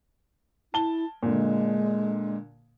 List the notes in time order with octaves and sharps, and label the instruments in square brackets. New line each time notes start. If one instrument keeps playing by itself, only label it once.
[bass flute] E4 [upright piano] A5 G7
[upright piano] A#2 D3 [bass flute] G#3